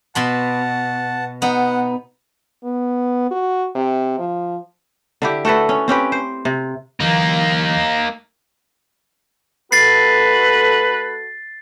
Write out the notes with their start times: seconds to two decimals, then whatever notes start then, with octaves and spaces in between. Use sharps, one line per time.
0.15 B2 F#5 A5 B5 C6
1.42 B3 D#4 F#5
2.64 B3
3.31 F#4
3.75 C3
4.19 F3
5.22 D3 E4 G4
5.45 A3 F#4 A4 B4
5.69 C#4
5.88 C4 C#4 G4 B4
6.12 C5
6.45 C3
7.01 D3 E3 F#3 A#3 D#4
9.72 A3 F#4 A4 B4 A6 C7